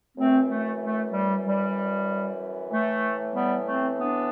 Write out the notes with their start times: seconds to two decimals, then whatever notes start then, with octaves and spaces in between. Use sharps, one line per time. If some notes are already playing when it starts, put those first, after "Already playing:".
0.17 F#2 E3 A3 C4
0.49 A3
0.80 A3
1.12 G3
1.44 G3
2.71 A2 E3 A3
3.34 G3 B3
3.65 A3 C4
3.97 B3 D4